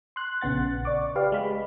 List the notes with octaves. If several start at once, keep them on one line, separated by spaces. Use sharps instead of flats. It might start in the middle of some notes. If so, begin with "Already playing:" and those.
C6 F#6
A#1 C#3 B3 F#5 A6
D5 C#6 D6
G4 B4 D5 F5
G#3 B5